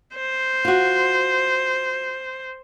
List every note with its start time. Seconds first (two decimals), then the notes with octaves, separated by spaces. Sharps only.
0.16 C5
0.65 F4 F#4